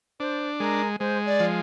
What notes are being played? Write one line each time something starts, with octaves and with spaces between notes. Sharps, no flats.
D4 C5
G#3 A#4
G#3 C5
D5
F3